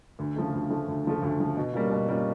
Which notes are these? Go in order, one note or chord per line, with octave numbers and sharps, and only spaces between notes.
D2
C#3 F3 A3
D2
C#3 F3 A3
D2
C#3 F3 A3
D2
C#3 F3 A3
B2
G3 A#3 C#4 F4
B2
G3 A#3 C#4 F4